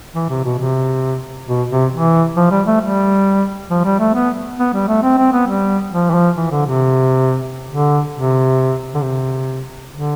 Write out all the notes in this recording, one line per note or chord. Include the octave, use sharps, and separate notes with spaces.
E3
C3
B2
C3
B2
C3
E3
F3
G3
A3
G3
F3
G3
A3
B3
B3
G3
A3
C4
C4
B3
G3
F3
E3
F3
E3
D3
C3
D3
C3
D3
C3
D3